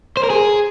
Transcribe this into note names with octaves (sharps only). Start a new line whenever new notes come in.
C5
A#4
G#4